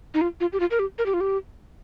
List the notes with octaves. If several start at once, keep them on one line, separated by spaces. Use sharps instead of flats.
D#4
F4
F4
G4
F4
A#4
G4
A#4
G4
F4
G4